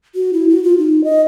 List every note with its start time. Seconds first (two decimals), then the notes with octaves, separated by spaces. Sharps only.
0.15 F#4
0.33 E4
0.49 F#4
0.64 F4
0.78 D#4
1.04 D#5